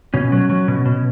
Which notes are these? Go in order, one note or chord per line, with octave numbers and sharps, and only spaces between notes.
B2 C#4
F#3
F#3
B2
B2